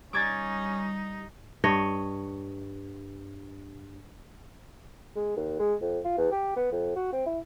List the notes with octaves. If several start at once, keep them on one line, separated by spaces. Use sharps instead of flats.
G3 C#4 D#4 D6 G#6 A6
G2 C#5 D#5
G#3
D#2
G#3
F2
F4
E2
G4
B3
F2
F#4
C4
E4